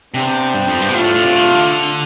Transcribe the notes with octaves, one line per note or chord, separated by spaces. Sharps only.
C3 B3 D4 G4 C5 G5
G2
F2
G2
B2
A2 A3 D4 F4
A2
A2
C3
D3
C3
D3